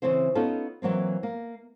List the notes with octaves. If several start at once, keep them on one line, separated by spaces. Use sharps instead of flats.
C#3 E3 C4 E4 C5
B3 C#4 D#4 F4 A4
E3 F#3 A#3 C4
A#3